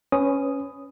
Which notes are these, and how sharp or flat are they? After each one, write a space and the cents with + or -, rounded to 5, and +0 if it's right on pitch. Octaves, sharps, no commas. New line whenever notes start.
C#4 +0 B4 +20 D#6 +0